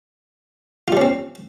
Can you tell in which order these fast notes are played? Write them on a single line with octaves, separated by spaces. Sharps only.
F4 G3 C#4 C4